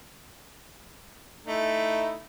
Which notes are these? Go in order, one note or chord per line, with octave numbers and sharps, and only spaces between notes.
A3 D#4 E4